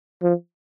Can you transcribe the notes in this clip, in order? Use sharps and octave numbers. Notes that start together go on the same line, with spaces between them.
F3